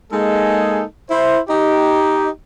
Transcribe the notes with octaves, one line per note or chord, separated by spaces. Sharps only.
G#3 A#3 D#4 G#4 A4
E4 C5
D#4 G4